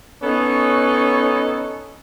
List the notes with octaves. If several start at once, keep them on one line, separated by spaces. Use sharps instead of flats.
B3 C#4 D#4 A4 C#5